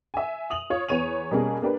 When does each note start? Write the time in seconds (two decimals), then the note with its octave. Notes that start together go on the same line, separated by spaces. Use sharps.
0.14 E5 G#5
0.50 D#6 F7 F#7
0.70 F4 C#5
0.89 E2 B3 C#5 D#7 F7
1.31 B2 G3 A#3 C#4 G#4 A#4
1.62 A#3 D4 G4 A#4 B4